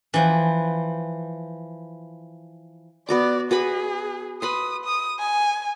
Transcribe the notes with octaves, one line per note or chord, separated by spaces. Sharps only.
E3 F3 G5
B3 F#4 D5 D6
F#4 G#4 B4 B5
B4 B5 C6 D#6
D#6
G#5